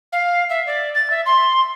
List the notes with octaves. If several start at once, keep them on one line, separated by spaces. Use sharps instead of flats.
F5
E5
D5
A6
E5
C6